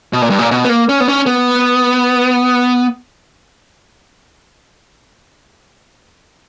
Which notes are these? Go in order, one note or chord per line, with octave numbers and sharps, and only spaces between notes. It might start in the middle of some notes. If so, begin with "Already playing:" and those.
B2
A#2
G2
A#2
B2
B3
A#3
C#4
B3
C#4
B3